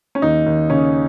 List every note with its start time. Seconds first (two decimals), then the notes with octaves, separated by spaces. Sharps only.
0.15 C#4
0.22 D#2 D#4
0.46 D#2
0.70 C#3 C#4